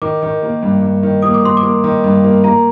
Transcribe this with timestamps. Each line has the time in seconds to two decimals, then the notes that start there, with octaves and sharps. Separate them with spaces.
0.02 D#3 D6
0.23 D#3
0.43 A#3
0.63 G2
0.82 G2
1.03 D#3
1.22 A#3 D#6
1.34 D6
1.43 A#3 C6
1.57 D6
1.63 A#3
1.84 D#3
2.04 G2
2.24 A#3
2.44 A#3 A#5